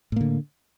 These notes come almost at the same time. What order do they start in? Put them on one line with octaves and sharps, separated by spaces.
A2 A#3 D3